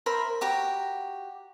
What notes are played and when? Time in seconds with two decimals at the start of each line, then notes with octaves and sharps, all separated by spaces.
0.06 A#4 C5 E5 B5
0.41 F#4 G4 A#5